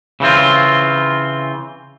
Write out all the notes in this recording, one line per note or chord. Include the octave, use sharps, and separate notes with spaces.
C#3 E3 C4 F4